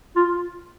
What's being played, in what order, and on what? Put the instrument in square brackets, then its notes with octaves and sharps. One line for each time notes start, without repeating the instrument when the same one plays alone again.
[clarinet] F4